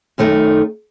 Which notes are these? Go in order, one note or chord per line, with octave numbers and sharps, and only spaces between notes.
F#2 D#3 A3 D#4